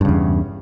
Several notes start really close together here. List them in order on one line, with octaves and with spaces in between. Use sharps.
G2 C#3 E2